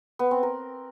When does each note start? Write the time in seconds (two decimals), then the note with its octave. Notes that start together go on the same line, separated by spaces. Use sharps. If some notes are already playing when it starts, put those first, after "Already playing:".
0.19 B3
0.31 C4
0.43 A#4